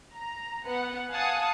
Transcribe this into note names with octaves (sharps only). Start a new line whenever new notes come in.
A#5
B3 F#5
F5 F#5 G#5 A5 D#6